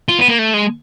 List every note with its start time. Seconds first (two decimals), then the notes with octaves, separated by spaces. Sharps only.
0.09 F4
0.18 B3
0.28 A#3
0.39 A3
0.54 G#3